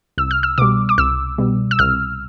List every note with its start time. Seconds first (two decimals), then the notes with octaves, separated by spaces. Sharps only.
0.18 C2 E6
0.31 F6
0.43 E6
0.58 B2 G3 D6
0.89 D6
0.98 C2 E6
1.38 B2 G3
1.71 E6
1.79 C2 F6